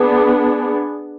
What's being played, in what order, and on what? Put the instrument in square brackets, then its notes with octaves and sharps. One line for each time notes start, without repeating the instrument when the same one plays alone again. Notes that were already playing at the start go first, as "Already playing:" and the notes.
Already playing: [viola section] B3 D4 G#4